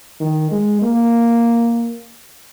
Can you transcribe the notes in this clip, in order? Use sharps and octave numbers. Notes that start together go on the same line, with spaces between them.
D#3
G#3
A#3